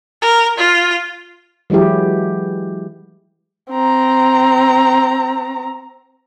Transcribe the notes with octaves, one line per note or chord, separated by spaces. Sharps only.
A#4
F4
E3 F#3 G#3 E4 G4
C4 A#5